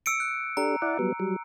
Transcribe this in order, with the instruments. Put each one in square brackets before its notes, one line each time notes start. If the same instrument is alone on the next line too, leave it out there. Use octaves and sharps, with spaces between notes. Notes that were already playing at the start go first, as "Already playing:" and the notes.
[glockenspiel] E6 C#7 D7
F#6
[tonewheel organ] D4 G4 A4 [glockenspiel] A#5
[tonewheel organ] E4 D5 F#5
F#3 G3 B3
F#3 G3